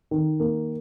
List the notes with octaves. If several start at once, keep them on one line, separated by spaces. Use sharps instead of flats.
D#3
A#3